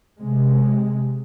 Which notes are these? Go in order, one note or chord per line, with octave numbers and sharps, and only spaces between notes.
C3 G#3